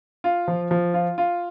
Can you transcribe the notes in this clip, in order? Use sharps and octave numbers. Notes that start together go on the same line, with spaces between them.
F4
F3
F3
F4
F4